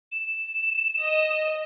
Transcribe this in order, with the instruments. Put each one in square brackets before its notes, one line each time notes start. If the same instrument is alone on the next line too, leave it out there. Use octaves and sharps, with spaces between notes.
[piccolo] E7
[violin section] D#5